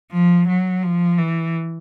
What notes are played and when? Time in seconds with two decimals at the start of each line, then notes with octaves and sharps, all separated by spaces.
0.12 F3
0.47 F#3
0.83 F3
1.18 E3